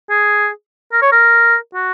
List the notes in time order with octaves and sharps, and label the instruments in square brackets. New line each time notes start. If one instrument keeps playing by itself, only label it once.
[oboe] G#4
A#4
C#5
A#4
F#4